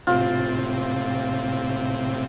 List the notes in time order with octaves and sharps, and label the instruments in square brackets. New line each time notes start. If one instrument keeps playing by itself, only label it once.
[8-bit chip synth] A2 C3 C4 [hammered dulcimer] F4